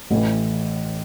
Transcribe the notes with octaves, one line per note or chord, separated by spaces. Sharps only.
A1 A2 E3